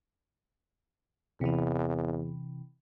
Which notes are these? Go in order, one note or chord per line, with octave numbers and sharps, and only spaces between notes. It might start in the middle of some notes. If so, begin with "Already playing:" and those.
E2 C3 E3